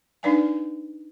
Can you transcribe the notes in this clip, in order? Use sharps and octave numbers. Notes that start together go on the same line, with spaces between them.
D4 D#4 B4 D5 F5 G#5